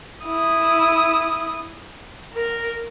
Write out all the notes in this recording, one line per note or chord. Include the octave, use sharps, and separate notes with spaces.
E4 D#6
A#4